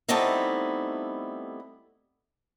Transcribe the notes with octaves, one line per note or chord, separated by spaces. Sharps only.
G3 A3 B3 C4 D#4 E4